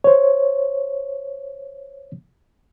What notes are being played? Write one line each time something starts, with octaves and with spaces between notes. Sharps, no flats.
C5 C#5